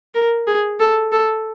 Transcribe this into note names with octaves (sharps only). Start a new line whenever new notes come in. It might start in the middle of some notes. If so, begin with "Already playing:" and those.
A#4
G#4
A4
A4